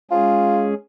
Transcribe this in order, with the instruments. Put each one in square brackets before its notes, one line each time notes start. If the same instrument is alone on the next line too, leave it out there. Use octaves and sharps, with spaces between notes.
[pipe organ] G#3 C#4 G#4 [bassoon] F4